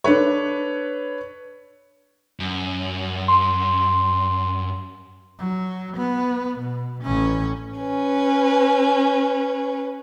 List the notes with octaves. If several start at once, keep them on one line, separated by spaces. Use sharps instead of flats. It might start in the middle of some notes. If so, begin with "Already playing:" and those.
D4 A4 B4 C#5
F#2
C6
F#3
B3
B2
A1 C#4
C#4 B4